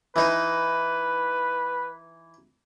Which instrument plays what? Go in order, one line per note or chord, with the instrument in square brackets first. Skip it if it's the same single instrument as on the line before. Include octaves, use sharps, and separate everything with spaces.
[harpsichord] E3 D#4 [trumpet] B4